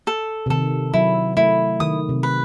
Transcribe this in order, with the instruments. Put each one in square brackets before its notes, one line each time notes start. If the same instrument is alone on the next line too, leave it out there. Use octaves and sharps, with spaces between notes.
[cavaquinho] A4
[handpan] C3
[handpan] D#3 [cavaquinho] A4
[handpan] F#3 [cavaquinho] E4
[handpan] A3 [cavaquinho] E4
[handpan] D#3 [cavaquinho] D#6
[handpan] C3
[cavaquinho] B4